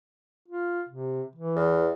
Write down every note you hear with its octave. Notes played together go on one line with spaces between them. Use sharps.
F4
C3
E3
E2